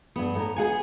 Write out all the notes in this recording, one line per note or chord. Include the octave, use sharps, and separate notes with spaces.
G2 B3
A2 B3 A#5
B3 G#4 F#5 G#5